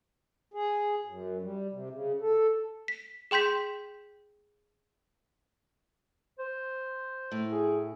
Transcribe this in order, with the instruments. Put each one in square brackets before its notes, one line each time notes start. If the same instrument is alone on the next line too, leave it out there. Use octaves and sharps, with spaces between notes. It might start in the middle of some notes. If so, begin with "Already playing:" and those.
[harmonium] G#4
F#2
G3
C3
C#3
A4
[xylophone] B6
G#4 G5 C6 G6 B6
[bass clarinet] C5
[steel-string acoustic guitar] A2
[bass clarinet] G#4